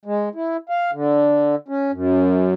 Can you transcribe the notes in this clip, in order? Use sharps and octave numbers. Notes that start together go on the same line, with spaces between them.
G#3
E4
F5
D3
C#4
F#2